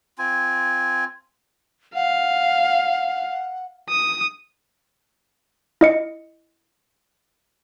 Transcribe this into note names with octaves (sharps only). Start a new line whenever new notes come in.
C4 F4 G#5
F5 F#5
D#6
E4 D#5 C#7